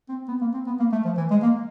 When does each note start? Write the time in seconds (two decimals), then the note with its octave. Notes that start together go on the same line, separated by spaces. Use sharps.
0.09 C4
0.28 B3
0.41 A#3
0.54 C4
0.67 B3
0.79 A#3
0.92 A3
1.05 F3
1.17 E3
1.31 G#3
1.42 A#3